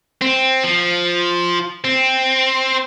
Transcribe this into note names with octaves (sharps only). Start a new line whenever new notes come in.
C4
F3
C4